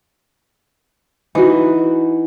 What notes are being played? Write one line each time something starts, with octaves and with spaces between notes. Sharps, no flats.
E3 D#4 F#4